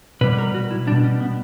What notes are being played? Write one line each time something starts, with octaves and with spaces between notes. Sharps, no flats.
B2 G3 B4
B4
A#4
F#4
E4
B2 G3 D4
C#4
B3